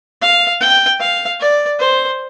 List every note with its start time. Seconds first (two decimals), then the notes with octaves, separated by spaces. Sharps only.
0.21 F5
0.61 G5
1.00 F5
1.40 D5
1.79 C5